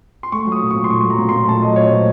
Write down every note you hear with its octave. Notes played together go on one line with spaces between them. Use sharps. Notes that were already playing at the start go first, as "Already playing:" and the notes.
C6
A3 C#6
F#3
D#6
A#2
C#6
A#2
C6
A3 C#6
F#3
A#5
A#2
C6
A#2
A3 A5
F#3 D#5
A#2 C#5
A#2 C5